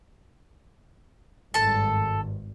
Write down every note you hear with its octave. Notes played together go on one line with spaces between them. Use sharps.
G#1 G2 A4 A5